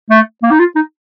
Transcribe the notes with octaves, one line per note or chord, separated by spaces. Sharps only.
A3
A#3
D#4
F4
D#4